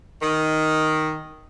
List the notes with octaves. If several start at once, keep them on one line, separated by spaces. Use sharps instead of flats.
D#3